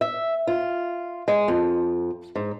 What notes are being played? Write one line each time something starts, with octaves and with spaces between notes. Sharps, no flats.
E5
F4
G#3
F2
G#2